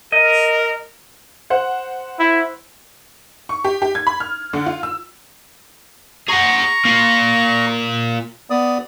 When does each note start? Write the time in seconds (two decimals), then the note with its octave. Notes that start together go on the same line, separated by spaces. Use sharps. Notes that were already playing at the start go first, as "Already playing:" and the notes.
0.12 A#4 D#5
1.50 C5 F#5
2.19 E4
3.49 C#6
3.64 G4
3.82 G4
3.95 G#6
4.07 B5
4.20 F6
4.53 D3
4.66 F4
4.83 E6
6.29 G#4 F#5 A#5 C#6
6.85 A#3 F4
8.50 B3 D5 D#6